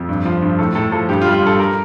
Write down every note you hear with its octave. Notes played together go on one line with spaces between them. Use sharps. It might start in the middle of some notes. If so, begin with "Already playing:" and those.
Already playing: F2 F4
G2
F3
G2
A2 A4
A2 A4
F3 A4
G2 G4
F4
G3
F4
G2 A4
A#4